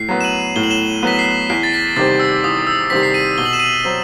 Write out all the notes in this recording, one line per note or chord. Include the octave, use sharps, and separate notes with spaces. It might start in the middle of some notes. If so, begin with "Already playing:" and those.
Already playing: A2 C7
F#3 B3
E7
D#7 F#7
A2 G7
F#7
E7 G7
F#3 B3 B6
C7
E2 C7
A6
B6
C3 D#3 G3 C4 A6
E6
E2 D#6
E6
C3 D#3 G3 C4 B6
C7
B6 D#7
B2 G7
F#7
E7
D#7 F#7
F#3 C4